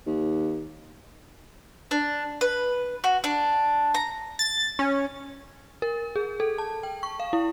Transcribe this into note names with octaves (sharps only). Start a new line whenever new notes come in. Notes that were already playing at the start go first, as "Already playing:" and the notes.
D#2
D4
B4
F#4
D4
A#5
A6
C#4
A#4
G#4
A4
A5
G5
C#6
F5
E4